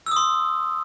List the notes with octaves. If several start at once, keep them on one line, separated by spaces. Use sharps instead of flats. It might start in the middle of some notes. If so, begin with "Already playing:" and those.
E6
D#6
C6